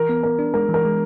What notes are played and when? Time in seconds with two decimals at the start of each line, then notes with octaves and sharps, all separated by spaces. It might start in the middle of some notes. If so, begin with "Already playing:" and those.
Already playing: E3 A#4
0.09 B3
0.23 B3 A#4
0.39 D4
0.54 G#3 A#4
0.69 E3
0.74 A#4
0.85 G#3